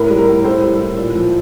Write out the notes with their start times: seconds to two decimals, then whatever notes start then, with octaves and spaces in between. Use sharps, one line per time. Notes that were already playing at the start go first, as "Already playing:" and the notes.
Already playing: A2 A#4
0.10 G3
0.18 A#4
0.28 A2
0.44 A2 A4 C5
0.62 G3
0.80 A2
0.97 A#2
1.15 F3